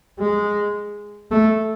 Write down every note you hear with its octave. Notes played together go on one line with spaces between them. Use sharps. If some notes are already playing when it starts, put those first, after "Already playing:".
G#3
A3